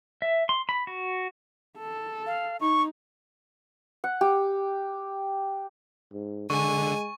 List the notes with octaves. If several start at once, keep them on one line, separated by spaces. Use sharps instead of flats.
E5
C6
B5
F#4
A4
F5
D#4 C#6
F#5
G4
G#2
D3 G#3 G#5 C#6